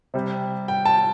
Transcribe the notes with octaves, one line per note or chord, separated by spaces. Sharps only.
C3 G3
G5
A5